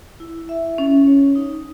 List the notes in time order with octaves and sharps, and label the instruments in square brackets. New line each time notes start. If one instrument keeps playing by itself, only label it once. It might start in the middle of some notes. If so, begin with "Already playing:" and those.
[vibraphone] E4
E5
C#4
C#5
D#4